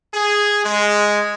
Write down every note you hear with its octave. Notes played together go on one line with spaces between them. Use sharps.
G#4
G#3